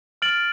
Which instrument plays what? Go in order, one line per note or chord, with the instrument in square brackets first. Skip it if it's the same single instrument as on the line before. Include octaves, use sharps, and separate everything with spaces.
[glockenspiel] F6 A6 D7 F#7